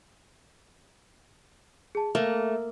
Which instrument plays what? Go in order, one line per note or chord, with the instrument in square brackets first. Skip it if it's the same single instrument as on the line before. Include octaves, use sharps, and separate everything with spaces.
[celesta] G#4 A5
[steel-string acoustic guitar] A3 [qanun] A#3 [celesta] F6